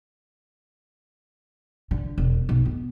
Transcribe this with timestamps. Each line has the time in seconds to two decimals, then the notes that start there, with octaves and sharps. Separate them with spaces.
1.91 D3
2.18 E1
2.49 B1
2.65 B3